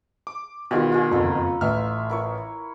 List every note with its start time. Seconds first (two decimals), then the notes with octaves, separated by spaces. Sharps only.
0.27 D6
0.71 B2 D#3 G3 E4 F4
0.92 F4 G#4
1.11 F#1 F2 A4 A#5 B5
1.61 A1 E5 F6
2.10 E4 A#4 C#5